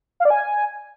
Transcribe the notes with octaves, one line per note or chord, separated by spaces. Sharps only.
F5
D5
G#5